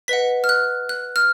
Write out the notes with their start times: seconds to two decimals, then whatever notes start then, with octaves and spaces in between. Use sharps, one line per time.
0.08 B4 D#5 F#5 B6
0.44 F6
0.49 F#6
0.89 F#6
1.16 F6